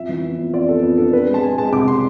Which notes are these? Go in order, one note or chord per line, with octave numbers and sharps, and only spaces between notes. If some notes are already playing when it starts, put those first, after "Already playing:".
Already playing: F2 E5
E3
B3
F2
F2 D5
B3 A4
F2
D4 A4
C4 B4
G#3
A5
G#3 G#5
G#3 A5
C2 D6
C3 C6